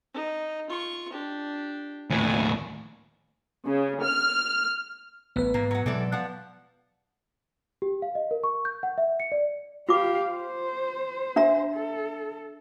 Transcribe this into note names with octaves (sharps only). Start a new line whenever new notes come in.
D#4
F4 C#6
D4 G4
D#2 A2 G#5
C#3
F6
A1 B3 B4
G#2 A#3
F#3 F#5
B2 E3 F#3 G#3 A4 D5
F3 F#5
G4
F5
D#5
A#4
C#6
G6
F#5
E5
C#7
D5
F4 G4 F5 D6
C5
D4 E5 A#5
A4